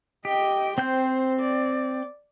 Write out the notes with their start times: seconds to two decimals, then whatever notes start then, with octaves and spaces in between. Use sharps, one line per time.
0.25 G4 D#5 G5
0.78 C4 C5 G5 G6
1.40 D5